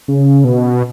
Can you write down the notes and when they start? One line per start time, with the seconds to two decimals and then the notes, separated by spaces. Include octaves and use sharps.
0.08 C#3
0.44 B2